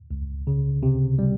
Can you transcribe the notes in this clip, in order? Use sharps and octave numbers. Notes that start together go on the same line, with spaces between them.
C#2
C#3
C3
G3